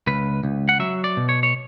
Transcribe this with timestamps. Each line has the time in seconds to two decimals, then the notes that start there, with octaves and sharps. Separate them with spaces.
0.07 C#2 B4
0.44 C#2
0.69 F#5
0.80 F#3 E5
1.04 D5
1.17 B2
1.29 C#5
1.43 C#5